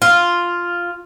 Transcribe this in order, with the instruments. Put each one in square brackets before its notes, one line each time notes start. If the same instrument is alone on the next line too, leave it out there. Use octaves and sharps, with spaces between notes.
[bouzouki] F4